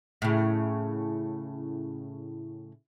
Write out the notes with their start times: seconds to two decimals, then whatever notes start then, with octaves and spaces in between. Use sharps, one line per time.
0.22 A2 C#3